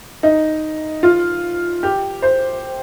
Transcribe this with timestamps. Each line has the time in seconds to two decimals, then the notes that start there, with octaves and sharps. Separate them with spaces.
0.23 D#4
1.03 F4
1.83 G4
2.22 C5